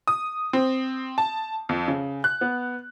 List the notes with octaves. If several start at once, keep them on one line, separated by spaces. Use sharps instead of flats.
D#6
C4
A5
F2
C#3
F#6
B3